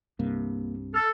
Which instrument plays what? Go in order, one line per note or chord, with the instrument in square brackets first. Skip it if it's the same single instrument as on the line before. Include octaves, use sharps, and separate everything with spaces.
[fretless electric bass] C2 G2 C3 [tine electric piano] A#3
[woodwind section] A4 [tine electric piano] F6